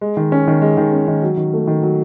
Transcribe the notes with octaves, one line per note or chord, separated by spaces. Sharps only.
G#3
D#3
C#4
D#3
G#3
D#3
C#4
D#3
F#3
D#3
A3
D#3
F#3